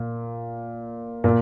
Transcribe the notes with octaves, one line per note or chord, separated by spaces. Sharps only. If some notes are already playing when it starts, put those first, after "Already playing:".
Already playing: A#2
A#2